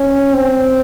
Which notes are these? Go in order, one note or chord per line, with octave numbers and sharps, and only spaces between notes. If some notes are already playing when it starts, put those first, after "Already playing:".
Already playing: C#4
C4